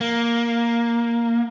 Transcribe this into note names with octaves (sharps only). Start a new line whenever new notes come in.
A#3